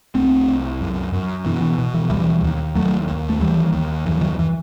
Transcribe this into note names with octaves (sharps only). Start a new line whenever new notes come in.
C2 A3 C4
C2
F#2
F#2
B2 E3
E3
B2
E3
D#2 E3 G3
D#2
D#2 F#3 A3
D#2
A3
D#2 E3 G3
D#2
F#2 E3
D#3 F#3
E3